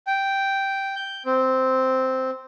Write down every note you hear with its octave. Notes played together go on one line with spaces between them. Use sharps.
G5
G6
C4